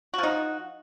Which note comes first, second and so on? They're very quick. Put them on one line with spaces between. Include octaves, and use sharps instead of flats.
F#4 F3 D#4